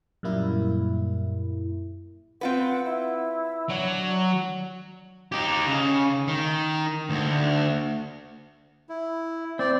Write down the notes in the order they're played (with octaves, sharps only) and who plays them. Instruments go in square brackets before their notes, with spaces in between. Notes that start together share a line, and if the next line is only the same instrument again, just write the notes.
[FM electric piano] F#2 A#2 G3 A#3 E4
[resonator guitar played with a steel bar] C4 F4 B4 [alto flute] F#5
[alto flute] E4
[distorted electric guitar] F#3 [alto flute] D4
[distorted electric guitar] D#4 G4
C#3
D#3
D2
[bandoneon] E4
[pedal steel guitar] C4 [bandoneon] D5